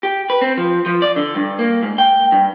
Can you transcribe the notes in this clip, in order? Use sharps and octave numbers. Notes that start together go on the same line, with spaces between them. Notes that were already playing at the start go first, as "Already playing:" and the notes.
G4
B4
C4
F3
F3
D5
D3
G2
A#3
G#2
G5
G2